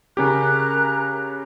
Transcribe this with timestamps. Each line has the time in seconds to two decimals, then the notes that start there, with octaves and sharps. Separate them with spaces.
0.17 C#3 C#4 G4 A#4 A#5 F#6